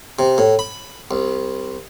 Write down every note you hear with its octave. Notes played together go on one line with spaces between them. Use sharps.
C3
A2
B5
C2